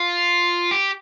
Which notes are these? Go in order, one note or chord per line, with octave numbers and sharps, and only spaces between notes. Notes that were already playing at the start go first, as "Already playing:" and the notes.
Already playing: F4
G4